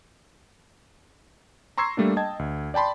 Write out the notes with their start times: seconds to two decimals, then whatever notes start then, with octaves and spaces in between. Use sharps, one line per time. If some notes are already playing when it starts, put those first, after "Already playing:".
1.77 A#5 C6 C#6 E6 G#6 C7
1.97 G3 A3 A#3 D4
2.17 D#5 G5 A5 G#6
2.39 D2
2.74 D5 G5 A5 B5 C6